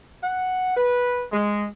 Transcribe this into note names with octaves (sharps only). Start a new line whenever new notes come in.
F#5
B4
G#3